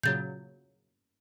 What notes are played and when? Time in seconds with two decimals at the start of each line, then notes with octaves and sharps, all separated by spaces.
0.03 A#2 C#3 F#3 G6 A6